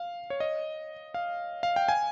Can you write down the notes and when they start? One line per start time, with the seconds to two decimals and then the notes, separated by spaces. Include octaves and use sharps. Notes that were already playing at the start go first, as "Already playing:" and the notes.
Already playing: F5
0.30 C#5
0.40 D#5
1.14 F5
1.63 F5
1.76 G5
1.89 G#5